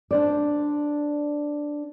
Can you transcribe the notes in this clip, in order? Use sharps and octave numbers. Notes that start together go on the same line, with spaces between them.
D4 C5 D5